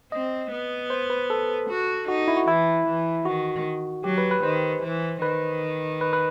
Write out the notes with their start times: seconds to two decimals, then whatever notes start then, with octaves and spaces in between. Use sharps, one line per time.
0.12 C4 D#5
0.51 B3
0.90 C5
1.10 B4
1.30 A4
1.70 F#4
2.08 D#4 F#4
2.28 E4
2.37 F#4
2.47 E3 E4
2.87 E3
3.25 D#3 F#4
4.04 F#3 G4
4.18 B4
4.31 B4
4.43 D#3 C5
4.82 E3
5.22 D#3 B4
6.01 B4
6.13 B4